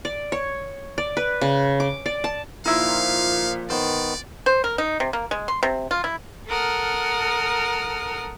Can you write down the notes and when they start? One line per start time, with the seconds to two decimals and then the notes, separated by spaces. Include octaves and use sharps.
0.05 D5
0.32 C#5
0.98 D5
1.17 B4
1.41 C#3
1.80 D6
2.06 D5
2.24 A5
2.65 A#2 F3 D#4 E4 F5
3.70 D#3 B3 C5 D5
4.46 C5
4.64 A#4
4.78 D#4
5.00 C3
5.13 A#3
5.31 G#3
5.48 C6
5.63 C3
5.91 F4
6.04 E4
6.48 A4 A#4 F#5 D#6 F6